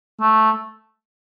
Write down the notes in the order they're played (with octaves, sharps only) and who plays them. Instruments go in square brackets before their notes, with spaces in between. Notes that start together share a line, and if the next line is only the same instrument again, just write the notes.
[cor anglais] A3